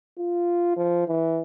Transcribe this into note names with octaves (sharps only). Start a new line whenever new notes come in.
F4
F3
E3